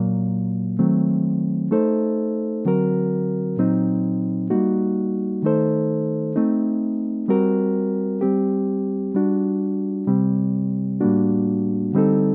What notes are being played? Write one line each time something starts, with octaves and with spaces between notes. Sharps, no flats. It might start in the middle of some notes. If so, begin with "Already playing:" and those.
Already playing: A#2 F#3 A#3
D#3 F#3 A3 C4
A3 D#4 A4 C5
D3 F#3 C4 F#4 A#4
A#2 F#3 C4 D#4
G3 A#3 D#4 F#4
D#3 A3 D#4 A4 C5
A3 C4 D#4
G3 C4 F#4 A#4
G3 C4 G4
G3 D4 F#4
C3 G3 C4
A2 G3 A#3 D4 F#4
D3 G3 C4 D#4 A4